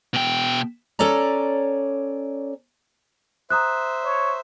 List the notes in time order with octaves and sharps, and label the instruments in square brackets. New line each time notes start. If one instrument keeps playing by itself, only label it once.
[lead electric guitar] B2 G5
[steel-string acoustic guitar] C#4 A4 C#5 D5 A#5
[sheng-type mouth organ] C5 E5 [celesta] A#5 D#6 F#6
[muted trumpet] C#5